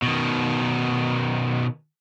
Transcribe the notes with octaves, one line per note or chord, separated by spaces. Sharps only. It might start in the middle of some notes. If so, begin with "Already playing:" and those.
B2 D#3